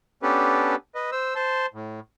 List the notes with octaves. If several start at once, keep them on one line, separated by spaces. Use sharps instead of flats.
B3 C#4 D4 G4 A4 B4
B4 D#5
C5 E6
C5 A5 C6
A2